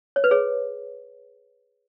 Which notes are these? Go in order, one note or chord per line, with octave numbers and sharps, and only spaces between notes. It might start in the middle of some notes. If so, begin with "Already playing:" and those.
C#5
B4
G#4 C#5